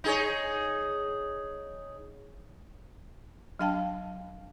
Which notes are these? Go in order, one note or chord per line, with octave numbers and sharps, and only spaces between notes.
D#4 G#4 C#5
F#3 D4 F5 G5 A5